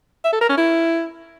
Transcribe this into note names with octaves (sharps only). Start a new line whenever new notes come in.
E5
A4
A#4
C#4
E4